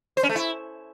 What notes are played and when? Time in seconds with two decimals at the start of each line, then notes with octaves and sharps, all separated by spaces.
0.17 C5
0.23 C#4
0.29 A3
0.36 E4